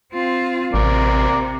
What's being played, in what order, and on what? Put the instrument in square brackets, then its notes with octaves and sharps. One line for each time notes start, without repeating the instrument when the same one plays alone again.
[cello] C4 F4
[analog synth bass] A1 [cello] C3 [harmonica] A#4 D5